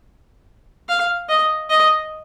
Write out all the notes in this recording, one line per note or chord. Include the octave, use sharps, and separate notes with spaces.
F5
D#5
D#5